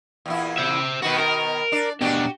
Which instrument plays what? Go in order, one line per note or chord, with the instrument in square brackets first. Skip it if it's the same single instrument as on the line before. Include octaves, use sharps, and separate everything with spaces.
[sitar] E2 A#2 E4
[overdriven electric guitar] C5 E5
[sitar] B2 D#3 B3 [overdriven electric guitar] F#4 B4
[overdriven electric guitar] A#4
[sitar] D4 D5
[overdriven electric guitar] B2 D4 [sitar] F#4 G4